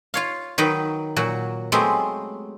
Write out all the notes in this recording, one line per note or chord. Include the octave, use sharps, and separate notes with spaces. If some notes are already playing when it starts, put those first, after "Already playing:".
F4 C#5 F5
D#3 F#3 D#4 B4 G5
A#2 F#3 F#4
F#3 G#3 A3 B3 C4 G4